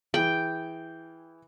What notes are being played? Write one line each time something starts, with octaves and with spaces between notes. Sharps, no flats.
E3 G#4 G5